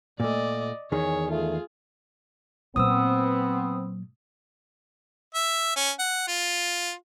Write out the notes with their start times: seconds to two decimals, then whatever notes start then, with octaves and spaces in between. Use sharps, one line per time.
0.20 A#2 A3 D5 D#5
0.92 E2 D#3 G#4 C#5
1.31 A3 F4 G#4
2.76 A#2 F#3 B3 C4 D#6 E6
5.35 E5
5.76 C#4
5.99 F#5
6.28 F4